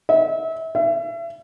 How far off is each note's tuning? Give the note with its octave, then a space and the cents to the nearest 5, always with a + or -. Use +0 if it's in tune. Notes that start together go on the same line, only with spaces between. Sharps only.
E5 -30
E5 +35